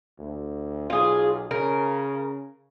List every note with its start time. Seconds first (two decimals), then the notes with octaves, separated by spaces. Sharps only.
0.19 D2
0.90 B1 F4 G#4
1.51 C#3 A#4